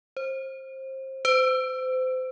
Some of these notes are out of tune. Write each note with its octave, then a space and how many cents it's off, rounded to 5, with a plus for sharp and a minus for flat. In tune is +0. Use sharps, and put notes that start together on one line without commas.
C5 +25
C5 -30